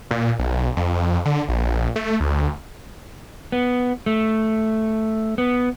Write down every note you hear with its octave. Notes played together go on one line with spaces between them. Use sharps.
A#2
B1
F2
D3
A#1
A3
D2
B3
A3
B3